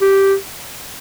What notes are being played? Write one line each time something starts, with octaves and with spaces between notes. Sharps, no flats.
G4